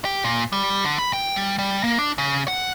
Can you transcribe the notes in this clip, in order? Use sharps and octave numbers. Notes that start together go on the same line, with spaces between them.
G4
A#2
G3
D3
B5
G5
G3
G3
A#3
D4
C#3
F#5